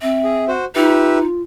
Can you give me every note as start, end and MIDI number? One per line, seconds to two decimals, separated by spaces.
0.02 0.54 60
0.02 0.51 76
0.24 0.45 68
0.48 0.65 66
0.48 0.65 72
0.76 1.26 63
0.76 1.42 65
0.76 1.18 67
0.76 1.18 71
0.76 1.18 76